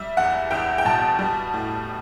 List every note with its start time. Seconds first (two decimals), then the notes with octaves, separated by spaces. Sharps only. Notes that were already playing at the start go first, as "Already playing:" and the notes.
Already playing: G3 E5
0.17 E2 F#5
0.51 E2 G5
0.78 G5
0.85 B2 A5
1.19 G3
1.54 A2